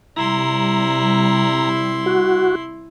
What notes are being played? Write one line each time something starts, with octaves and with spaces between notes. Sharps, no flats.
C3 G3 E4 A#5 C6
F#4